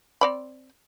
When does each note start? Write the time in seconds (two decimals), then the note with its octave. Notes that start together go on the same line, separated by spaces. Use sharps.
0.21 C4 D5 B5